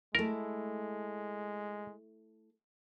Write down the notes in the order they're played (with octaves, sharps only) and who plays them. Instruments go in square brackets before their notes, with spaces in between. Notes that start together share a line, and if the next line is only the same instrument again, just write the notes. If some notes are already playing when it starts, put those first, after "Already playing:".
[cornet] G#3 [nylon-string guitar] A3 E4 [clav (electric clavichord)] A#4